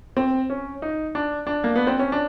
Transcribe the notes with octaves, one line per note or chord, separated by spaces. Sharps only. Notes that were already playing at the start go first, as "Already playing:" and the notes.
C4
C#4
D#4
D4
D4
A#3
B3
C4
C#4
D4